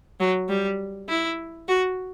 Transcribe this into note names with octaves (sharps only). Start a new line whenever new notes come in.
F#3
G3
E4
F#4